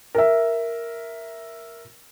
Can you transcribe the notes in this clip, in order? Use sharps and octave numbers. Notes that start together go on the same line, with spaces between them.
A#4 E5